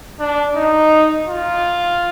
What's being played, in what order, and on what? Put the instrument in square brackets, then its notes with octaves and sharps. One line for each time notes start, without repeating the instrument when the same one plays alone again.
[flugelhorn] D4
D#4
F4